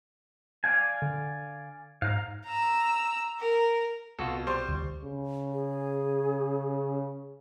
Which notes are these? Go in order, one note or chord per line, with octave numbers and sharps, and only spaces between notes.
D5 F5 G#5
D3
G#2 F5 A#5
A#5 E6
A#4
C2 B2 F4 F#4 A4
G3 C5 C6 C#6
D2
C#3
G#4